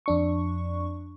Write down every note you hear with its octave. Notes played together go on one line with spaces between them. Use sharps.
F2 D4 C#6